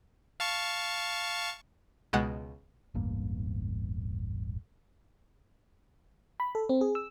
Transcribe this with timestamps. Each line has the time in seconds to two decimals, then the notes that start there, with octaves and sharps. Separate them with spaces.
0.40 F5 A5 C#6
2.13 C#2 B2 G#3 F#5
2.95 E1 A1 G2 A#3
6.40 B5
6.55 A4
6.69 C4
6.81 G#4
6.95 E6